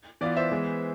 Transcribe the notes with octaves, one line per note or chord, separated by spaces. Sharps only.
E3 B3 F4 D5
C5 E5
E3 G#3 B3